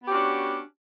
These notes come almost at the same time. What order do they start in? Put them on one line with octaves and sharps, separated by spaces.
B3 G4 C#4 F#4 D4